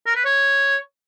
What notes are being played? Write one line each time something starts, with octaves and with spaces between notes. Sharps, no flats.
A#4
B4
C#5